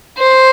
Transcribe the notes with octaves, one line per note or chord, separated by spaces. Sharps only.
C5